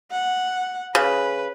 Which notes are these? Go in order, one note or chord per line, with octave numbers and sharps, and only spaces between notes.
F#5
C#3 B4